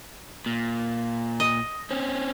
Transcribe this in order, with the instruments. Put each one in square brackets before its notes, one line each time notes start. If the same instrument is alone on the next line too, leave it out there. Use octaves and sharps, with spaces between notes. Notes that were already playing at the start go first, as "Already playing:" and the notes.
[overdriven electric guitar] A#2
[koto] D#5
[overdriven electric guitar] C4 C#4